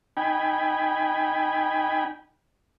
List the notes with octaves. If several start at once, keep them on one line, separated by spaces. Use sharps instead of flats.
D#4 G5 G#5 B5